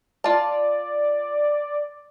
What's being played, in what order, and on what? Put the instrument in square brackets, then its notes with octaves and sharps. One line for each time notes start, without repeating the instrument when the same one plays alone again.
[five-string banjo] F4 A5 [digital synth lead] D5